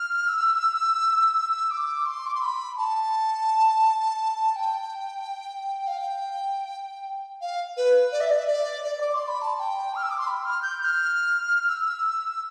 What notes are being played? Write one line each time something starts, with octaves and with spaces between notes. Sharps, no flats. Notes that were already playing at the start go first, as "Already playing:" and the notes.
Already playing: F6
E6
D6
C6
D6
C6
B5
A5
G5
F5
G5
F5
B4
D5
E5
D5
E5
D5
D5
D6
C6
B5
A5
A5
G5
F6
E6
D6
C6
B5
F6
G6
G6
F6
E6